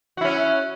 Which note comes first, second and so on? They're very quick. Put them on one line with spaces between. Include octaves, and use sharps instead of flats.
F#4 E4 C#4